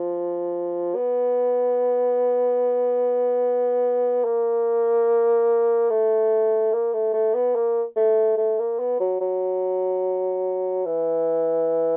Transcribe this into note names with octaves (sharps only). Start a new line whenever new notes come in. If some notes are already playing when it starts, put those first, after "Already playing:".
Already playing: F3
B3
A#3
A3
A#3
A3
A3
B3
A#3
A3
A3
A#3
B3
F#3
F#3
E3